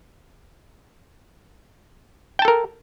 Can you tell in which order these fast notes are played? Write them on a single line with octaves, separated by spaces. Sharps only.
G5 A5 A4 A#4